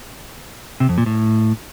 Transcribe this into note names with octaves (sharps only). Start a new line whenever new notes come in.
C3
F2
A#2
A2